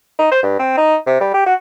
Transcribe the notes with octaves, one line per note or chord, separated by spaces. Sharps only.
D#4
C5
G2
C4
D#4
C3
G3
G4
F#4